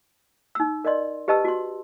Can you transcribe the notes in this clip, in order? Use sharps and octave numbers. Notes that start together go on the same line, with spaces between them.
D#4 E6
A#4 D5 D#5 C6
G4 B4 D#5 A5 E6
F#4 C6